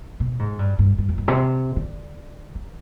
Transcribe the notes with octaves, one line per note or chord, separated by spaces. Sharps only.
B2
G#2
G2
G2
G2
F2
G2
C3
D3
D#3